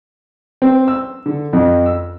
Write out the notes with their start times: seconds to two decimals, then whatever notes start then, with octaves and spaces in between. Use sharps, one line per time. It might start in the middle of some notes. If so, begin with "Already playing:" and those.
0.62 C4
0.88 E6
1.26 D3
1.53 F2
1.86 E6